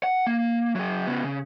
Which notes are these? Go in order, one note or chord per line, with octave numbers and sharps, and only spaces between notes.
F#5
A#3
F#3 G#4
C#3 B3
C#3